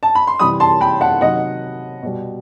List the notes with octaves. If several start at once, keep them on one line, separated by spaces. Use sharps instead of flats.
A5
B5
C6
C3 E3 G3 B5 D#6
A5 C6
G5 B5
F#5 A5
C3 D#3 F#3 D#5 F#5
B2 G3